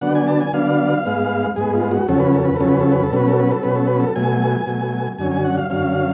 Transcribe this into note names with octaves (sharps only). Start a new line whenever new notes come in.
D3 F#3 B3 D4 F#5
G#5
A5
G#5
D3 F#3 B3 D4 F5
G#2 G#3 B3
G#2 G#3 B3 G#4
F4
F#4
F2 C#3 F#3 C#4 A4
B4
A4
B4
F2 C#3 F#3 C#4 A4
B4
A4
B4
A4
B2 F#3 C#4 B4
A4
B4
A4
B2 F#3 C#4 B4
A4
B4
A4
B2 F#3 A3 G#5
B2 F#3 A3
F#2 D3 F#3 C#4 G#5
G#5
F#5
F5
F#2 D3 F#3 C#4 F5